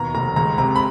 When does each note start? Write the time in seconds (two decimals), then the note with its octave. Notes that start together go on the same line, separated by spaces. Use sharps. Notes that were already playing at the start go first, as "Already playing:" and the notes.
Already playing: D#2 B2 A#5
0.15 F1 A#5
0.36 C#2 A#5
0.58 C3 A#5
0.76 B5